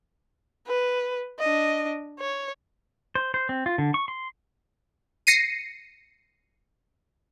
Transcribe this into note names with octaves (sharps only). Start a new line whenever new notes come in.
B4
D4 D#5
C#5
C5
C5
C4
F4
D3
C#6
C6
A#6 C7 C#7 D#7